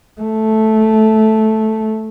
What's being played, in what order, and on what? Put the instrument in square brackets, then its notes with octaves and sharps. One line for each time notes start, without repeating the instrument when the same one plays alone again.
[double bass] A3